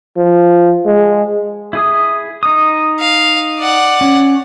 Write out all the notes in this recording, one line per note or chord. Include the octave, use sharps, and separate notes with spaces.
F3
G#3
E4 G#4 D#6
D#4 D#6
F5
D5 F#5
C#4